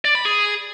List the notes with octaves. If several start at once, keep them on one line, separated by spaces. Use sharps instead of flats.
D5
B5
G#4